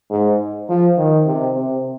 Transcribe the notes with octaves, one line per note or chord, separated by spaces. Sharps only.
G#2
F3
D#3
C3
C3